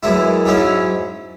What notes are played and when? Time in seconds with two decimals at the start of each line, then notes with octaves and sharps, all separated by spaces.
0.03 F#2 E3 G#3 E4
0.46 G#2 F#3 C#4 E4